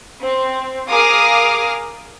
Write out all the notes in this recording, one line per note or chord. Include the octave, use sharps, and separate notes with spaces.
C4
G#4 A#4 F5 D6 D#6 F6